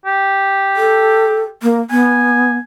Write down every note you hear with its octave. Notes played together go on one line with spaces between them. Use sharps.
G4
A4
A#3
B3 G#5